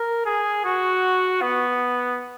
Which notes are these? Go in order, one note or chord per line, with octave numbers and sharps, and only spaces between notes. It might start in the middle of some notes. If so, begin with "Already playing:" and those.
Already playing: A#4
G#4
F#4
B3